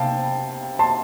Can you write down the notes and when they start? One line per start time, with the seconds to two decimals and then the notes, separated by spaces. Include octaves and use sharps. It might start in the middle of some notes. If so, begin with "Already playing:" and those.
Already playing: C3 F5 G5 A5
0.79 A5 C6